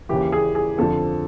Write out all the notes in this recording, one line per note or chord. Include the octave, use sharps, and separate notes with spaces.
D#2 C#3 E3 G4
G#4
G#4
F2 D3 F3 A4